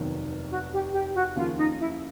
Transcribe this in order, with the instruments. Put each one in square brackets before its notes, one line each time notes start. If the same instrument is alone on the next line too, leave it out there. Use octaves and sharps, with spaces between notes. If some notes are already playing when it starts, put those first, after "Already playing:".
Already playing: [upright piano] F1 D#2 D#3 F#3 B3
[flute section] F#4
G4
G4
F#4
[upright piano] D#2 C#3 F3 A#3 [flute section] F4
[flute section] D#4
E4